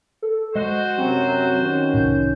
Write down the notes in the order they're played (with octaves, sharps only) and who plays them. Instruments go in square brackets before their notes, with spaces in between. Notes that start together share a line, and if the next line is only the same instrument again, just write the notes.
[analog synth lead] A4
[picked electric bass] G#3 [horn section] F#4 C5 [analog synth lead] D#5
[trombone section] F#2 C3 F#3 [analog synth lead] C4
[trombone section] D#3 C#4
[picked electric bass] C2 A2 [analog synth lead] G6